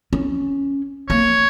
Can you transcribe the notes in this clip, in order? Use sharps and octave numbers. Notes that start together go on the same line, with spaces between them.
C#4
A#3 C#5